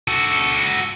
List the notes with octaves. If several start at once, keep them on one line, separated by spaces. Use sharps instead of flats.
F#4 A4